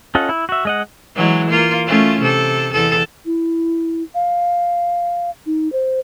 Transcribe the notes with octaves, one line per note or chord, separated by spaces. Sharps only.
C#4 F4 A4 D#5 F#5
E4
F#4 E5
G#3 D#5 F#5
E3 F#3 G#3
A#3 F4
A3 C#4 F4
C3 A4
E2 A4
E4
F5
D#4
C5